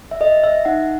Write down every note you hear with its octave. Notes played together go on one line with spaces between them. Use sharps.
E5
A4 D#5
E5
D#4 F#5